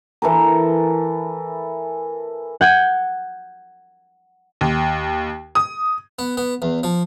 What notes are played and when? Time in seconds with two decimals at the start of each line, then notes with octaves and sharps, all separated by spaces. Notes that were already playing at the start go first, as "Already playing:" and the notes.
0.22 E3 A4 A#4
2.61 F#5 G6 G#6
4.61 D#2
5.55 D#6
6.19 B3
6.37 B3
6.62 E2
6.83 F3